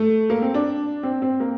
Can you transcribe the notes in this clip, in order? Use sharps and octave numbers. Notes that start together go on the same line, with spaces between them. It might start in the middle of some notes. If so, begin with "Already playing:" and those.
Already playing: A3
A#3
C4
D4
C4
C4
A#3